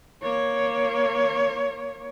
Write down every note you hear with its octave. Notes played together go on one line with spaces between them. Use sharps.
A#3 C#5